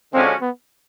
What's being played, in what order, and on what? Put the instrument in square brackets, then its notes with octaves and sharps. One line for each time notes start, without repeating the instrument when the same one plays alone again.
[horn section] D3 F3 G#3 C#4 F#4 [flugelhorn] C4
[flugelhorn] B3